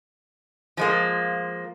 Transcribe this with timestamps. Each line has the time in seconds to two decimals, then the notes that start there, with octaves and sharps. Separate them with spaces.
0.77 F3 G#3 A#3